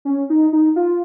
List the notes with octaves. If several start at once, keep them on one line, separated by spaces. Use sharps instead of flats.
C#4
D#4
D#4
F4